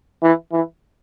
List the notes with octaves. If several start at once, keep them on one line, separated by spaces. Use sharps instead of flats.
E3
E3